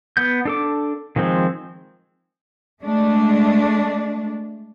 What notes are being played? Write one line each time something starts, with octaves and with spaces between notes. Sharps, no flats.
B3 G6
D4 A4 D6
D#3 F3 G#3 C4
G#3 A3 D4